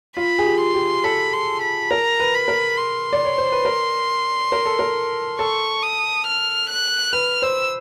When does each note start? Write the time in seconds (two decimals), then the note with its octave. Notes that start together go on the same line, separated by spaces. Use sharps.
0.17 F4 B5
0.38 G#4
0.46 G4
0.60 C6
0.74 G4
1.04 A4 B5
1.33 C6
1.62 B5
1.90 A#4 A#5
2.20 B4
2.34 B5
2.48 A#4
2.78 C6
3.13 D5
3.25 C#5
3.38 C5
3.52 B4
3.65 A#4
4.52 A#4
4.66 A4
4.79 A#4
5.39 A4 C#6
5.83 D#6
6.27 F6
6.70 F#6
7.13 B4 F6
7.42 C5 E6